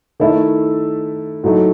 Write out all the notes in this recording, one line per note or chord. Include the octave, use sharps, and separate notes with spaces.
D#3 A3 E4 A4
A2 F#3 A3 D#4